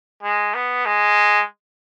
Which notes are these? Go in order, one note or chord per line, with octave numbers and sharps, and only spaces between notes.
G#3
B3
G#3